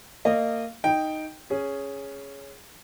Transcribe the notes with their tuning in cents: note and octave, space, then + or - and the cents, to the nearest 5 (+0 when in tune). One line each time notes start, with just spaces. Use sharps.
A#3 -25 D#5 -20
D#4 +0 G5 +0
C#4 +0 G#4 +0